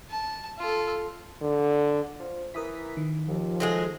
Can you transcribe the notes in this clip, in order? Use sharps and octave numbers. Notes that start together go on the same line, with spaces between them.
A5
F4 A4
D3
F3
E3 A#4 D#6 B6
D#3
D#2 F3
F#3 G#3 A3 G#4